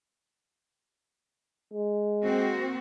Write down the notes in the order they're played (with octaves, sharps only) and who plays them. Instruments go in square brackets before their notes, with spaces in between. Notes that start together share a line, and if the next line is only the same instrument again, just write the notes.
[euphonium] G#3
[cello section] A#3 C4 F#4